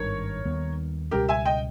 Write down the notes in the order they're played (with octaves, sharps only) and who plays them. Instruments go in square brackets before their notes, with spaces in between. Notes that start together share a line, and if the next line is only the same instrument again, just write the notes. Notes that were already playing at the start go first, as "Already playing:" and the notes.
Already playing: [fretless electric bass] G#1 G2 D#3 [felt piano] A#4 C#5
[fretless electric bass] D#2 D#3 G3 B3
[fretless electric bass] C#2 B2 G3 C#4 [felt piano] G4 A#4
[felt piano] E5 G#5
D#5 G5